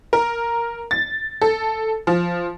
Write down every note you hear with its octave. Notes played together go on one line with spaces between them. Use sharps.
A#4
A6
A4
F3